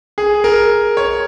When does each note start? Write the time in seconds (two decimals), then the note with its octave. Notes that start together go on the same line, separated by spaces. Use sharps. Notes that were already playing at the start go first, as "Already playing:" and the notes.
0.18 G#4
0.44 A#4
0.97 C#5